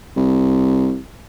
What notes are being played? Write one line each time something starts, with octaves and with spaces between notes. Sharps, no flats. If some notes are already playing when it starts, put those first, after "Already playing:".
C2